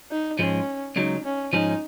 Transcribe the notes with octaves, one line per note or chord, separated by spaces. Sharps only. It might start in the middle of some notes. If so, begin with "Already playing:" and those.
D#4
G#2 F3 G#3 C#4
C#2 C#3 F#3 D#4
C#4
G#2 F3 G#3 C#4 D#4